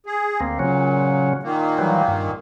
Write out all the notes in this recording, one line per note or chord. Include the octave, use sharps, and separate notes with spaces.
G#4
D2 A#3 C4
A#2 C#3 F#3 C#4
A#2 D#3 A#3
E3 F#3 G3
G2